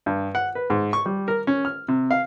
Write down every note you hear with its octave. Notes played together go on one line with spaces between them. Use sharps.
G2
F#5
B4
G#2
C#6
G3
A#4
C#4
F6
C3
F5